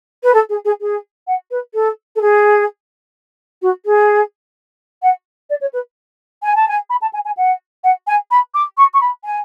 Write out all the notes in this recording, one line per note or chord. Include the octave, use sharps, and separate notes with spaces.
B4
A4
G#4
G#4
G#4
F#5
B4
A4
A4
G#4
F#4
G#4
F#5
D5
C#5
B4
G#5
A5
G#5
B5
A5
G#5
G#5
F#5
F#5
G#5
B5
D6
C#6
C#6
B5
G#5